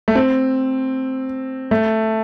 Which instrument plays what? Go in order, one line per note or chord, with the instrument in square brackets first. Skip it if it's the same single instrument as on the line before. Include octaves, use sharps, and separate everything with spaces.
[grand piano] A3
C4
A3